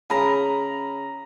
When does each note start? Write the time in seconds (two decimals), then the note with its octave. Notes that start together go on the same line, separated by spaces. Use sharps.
0.10 C#3 A#5 B5